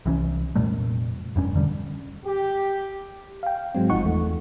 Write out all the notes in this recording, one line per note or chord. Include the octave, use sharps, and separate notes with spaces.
C2 E3 C4 C#4
F1 A#2 G3 A3
F1 G2 C#4
E1 D3 G3
G4
F5 G5
G#2 F#3 G#3 C4
G1 F3 D#4 F#5 C#6
E2 A3